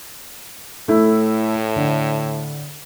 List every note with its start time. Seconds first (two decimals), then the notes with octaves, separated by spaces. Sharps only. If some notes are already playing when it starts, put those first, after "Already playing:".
0.88 A2 A3 E4
1.76 D3